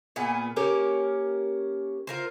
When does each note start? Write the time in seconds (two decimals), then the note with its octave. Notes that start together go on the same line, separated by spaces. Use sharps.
0.16 A#2 B3 G#4
0.56 A#3 C#4 G4 A#4
2.07 F4 A#4 C5